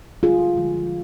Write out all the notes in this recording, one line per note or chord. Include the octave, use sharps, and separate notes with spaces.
D3 G3 F4 G#4
D3 F3 G#3